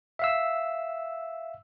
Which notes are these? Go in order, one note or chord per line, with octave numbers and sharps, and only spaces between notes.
E5 F5 E6